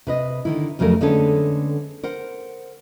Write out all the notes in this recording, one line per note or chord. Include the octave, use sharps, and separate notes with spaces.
C3 B4 D#5
D3 D#3 E4
F2 C#3 F#3 A3 A#4
D3 G#3 A3 B3 C#4 A4
A#4 C5 F#5